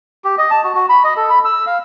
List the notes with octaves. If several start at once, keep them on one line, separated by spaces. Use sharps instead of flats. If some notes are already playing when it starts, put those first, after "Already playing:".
G4
D#5
A5
F#4
F#4
B5
D#5
A4
B5
E6
F5